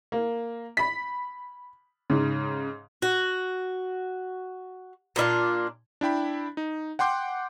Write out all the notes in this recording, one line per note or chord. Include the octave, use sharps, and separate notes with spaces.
A#3
B5 B6
G#2 C#3
F#4
A#2 D4 E4 F4
D4 E4 G5 B5
D#4
F#5 G5 C6 D6 G6